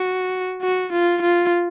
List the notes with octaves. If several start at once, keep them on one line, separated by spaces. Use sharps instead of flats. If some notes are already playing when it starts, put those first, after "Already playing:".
Already playing: F#4
F#4
F4
F4